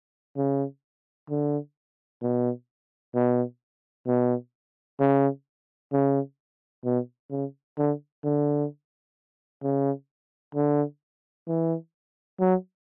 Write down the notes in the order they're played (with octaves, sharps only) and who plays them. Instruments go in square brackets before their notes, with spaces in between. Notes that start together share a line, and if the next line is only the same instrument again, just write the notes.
[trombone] C#3
D3
B2
B2
B2
C#3
C#3
B2
C#3
D3
D3
C#3
D3
E3
F#3